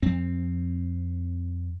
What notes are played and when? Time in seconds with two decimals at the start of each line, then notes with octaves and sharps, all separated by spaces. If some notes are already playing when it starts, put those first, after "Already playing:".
0.02 F2 C4